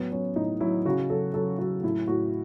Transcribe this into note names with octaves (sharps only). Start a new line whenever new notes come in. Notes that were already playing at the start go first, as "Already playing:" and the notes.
Already playing: A2 F#3 B3
F#3 C#4
A2 D#4
F#3 E4
C#3 F#4
F#3 A4
F#3 A4
F#3 F#4
A2 E4
A2 F#4